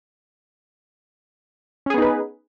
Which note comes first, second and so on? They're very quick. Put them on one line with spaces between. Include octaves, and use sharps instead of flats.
C#4 G#4 B3 D#4 B4